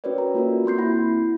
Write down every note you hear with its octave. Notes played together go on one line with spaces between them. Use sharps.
C#4 F#4 A#4 B4 C#5 D5
F#4 A#5
A#3 F4 F#4 A4 A#4
A#3 C4 C6 G6 C7
E4 F#5 B5 A#6